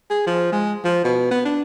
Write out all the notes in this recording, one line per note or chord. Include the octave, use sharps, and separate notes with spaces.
G#4
F3
G#3
F3
B2
B3
D4